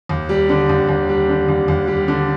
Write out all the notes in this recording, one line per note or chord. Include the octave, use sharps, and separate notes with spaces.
D#2
G3
D3
D#2
D#2
G3
D3
D#2
D#2
G3
D3